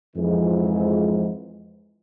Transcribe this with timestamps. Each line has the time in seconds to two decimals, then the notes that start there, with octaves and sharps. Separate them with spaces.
0.16 F2 G#2 E3 F3 G#3